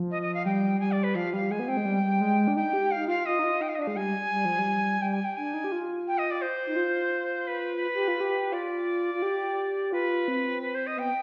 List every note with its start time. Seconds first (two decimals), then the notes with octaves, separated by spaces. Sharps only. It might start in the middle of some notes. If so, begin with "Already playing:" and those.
Already playing: F3
0.11 D#5
0.22 D#5
0.34 F5
0.45 G3 G5
0.80 G3 G#5
0.92 D5
1.03 B4
1.15 F3 F5
1.33 G3 F5
1.51 G#3 G#5
1.59 B3
1.68 C4 G5
1.77 G#3
1.85 G3
2.03 G3
2.21 G#3
2.48 D4
2.56 D#4 G5
2.73 G4
2.91 F5
2.96 D#4
3.08 F4 F5
3.26 F4 D#5
3.39 D#4
3.44 F4
3.61 D#4 G5
3.69 F5
3.75 D#5
3.79 D4 F5
3.87 G#3
3.96 G3 G#5
4.31 G3
4.45 F3
4.59 G3
5.01 G3 G5
5.13 G#5
5.24 G5
5.37 D4 G#5
5.54 D#4
5.64 G4
5.72 F4
6.07 G5
6.18 D#5
6.31 D5
6.41 C5
6.66 D#4
6.76 F4
7.47 B4
7.94 G4
8.08 F4
8.21 G4
8.52 F4 D5
9.14 F4
9.22 G4
9.92 F4 B4
10.28 C4
10.62 B4
10.75 C5
10.87 D#5
10.97 B3 G5